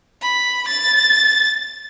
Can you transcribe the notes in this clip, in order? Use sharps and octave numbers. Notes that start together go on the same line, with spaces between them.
B5
A6